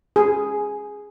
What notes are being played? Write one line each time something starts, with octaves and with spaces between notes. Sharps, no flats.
G#4